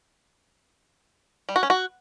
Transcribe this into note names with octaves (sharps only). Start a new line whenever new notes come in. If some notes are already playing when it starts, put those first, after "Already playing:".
G3
F#4
C#4
F#4